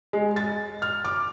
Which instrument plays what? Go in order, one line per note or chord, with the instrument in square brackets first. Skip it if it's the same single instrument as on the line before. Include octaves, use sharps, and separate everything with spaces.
[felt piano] G#3
A6
F6
D6